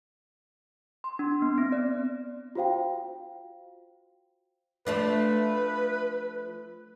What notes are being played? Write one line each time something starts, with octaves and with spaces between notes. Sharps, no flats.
C6
D4
B3
C4
D5
F4 F#4 C5 F5 G5
F3 A3 D4 B4